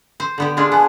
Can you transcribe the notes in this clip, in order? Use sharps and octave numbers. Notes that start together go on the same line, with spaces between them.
C5
D3 B3 G4
G#3 D4 F4
B3 G#5 A5 F#6